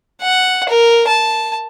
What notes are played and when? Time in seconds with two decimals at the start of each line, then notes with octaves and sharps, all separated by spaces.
0.22 F#5
0.69 A#4
1.08 A5